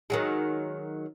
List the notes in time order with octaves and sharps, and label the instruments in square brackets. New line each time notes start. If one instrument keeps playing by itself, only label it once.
[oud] D#3 F#3 G#3